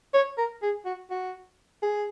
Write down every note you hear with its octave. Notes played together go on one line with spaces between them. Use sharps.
C#5
A#4
G#4
F#4
F#4
G#4